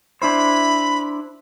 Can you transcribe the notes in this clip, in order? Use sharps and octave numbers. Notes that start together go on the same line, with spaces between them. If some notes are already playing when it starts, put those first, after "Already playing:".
D4 E4 C5 B5